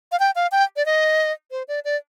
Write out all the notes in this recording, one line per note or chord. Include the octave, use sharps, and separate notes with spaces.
F5
G5
F5
G5
D5
D#5
C5
D5
D5